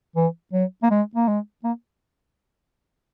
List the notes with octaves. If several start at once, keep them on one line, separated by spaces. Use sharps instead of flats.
E3
F#3
A#3
G#3
A#3
G#3
A#3